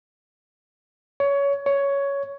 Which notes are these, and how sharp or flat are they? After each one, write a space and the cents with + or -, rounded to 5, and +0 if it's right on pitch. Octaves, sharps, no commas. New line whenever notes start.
C#5 +20
C#5 +10